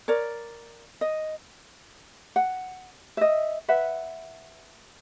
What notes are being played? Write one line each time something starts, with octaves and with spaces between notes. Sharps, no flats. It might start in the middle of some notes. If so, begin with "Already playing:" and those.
A#4 C#5 D5
D#5
F#5
D#5 E5
B4 E5 F#5